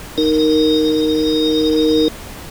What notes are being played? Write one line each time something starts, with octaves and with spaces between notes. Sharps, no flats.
D#4 A#4